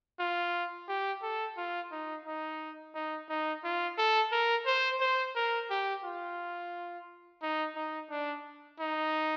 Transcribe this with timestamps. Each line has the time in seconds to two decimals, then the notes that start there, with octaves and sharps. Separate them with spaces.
0.20 F4
0.88 G4
1.22 A4
1.57 F4
1.92 D#4
2.26 D#4
2.95 D#4
3.29 D#4
3.64 F4
3.98 A4
4.32 A#4
4.66 C5
5.01 C5
5.36 A#4
5.71 G4
6.05 F4
7.42 D#4
7.76 D#4
8.10 D4
8.80 D#4